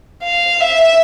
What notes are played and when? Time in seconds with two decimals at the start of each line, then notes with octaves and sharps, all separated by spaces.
0.23 F5
0.61 E5